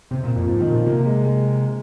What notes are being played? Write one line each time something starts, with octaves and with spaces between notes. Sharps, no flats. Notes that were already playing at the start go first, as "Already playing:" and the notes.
C3 C4
A#2 A#3
F2 F3
G#2 F3
D#3
A#2
F3
C3 A#3
G#3
G#3